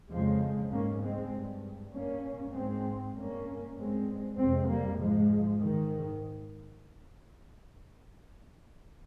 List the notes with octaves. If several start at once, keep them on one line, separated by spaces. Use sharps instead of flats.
F2 C#3 F3 G#3
G#2 A#3 C#4
G#3 C4
G2
G2 A#3 C#4
G#2 G#3 C4
G2 A#3 C#4
G2 G#3 C4
F2 C3 G#3 C4
G3 A#3
G#2 F3 G#3
G#2 D#3